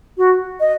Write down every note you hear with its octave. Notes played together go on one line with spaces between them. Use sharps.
F#4
D#5